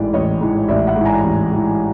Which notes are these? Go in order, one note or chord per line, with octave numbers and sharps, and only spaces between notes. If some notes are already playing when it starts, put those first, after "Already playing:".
Already playing: A1 G#2 E3 D5
A1 C#5 D#5
G#2 E3
A1 D5 E5
E5 F#5
G#2 E3
G#5 A#5
A1
G#2 E3